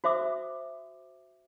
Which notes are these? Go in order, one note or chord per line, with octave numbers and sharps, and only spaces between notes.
F#4 C5 E5 D6 D#6